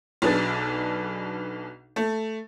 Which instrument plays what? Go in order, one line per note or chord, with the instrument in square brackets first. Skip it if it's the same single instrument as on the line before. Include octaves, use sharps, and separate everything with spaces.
[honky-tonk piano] B1 B2 D4 G#4 B4 A6
A3